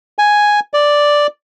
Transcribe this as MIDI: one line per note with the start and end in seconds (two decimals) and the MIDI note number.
0.19 0.60 80
0.74 1.27 74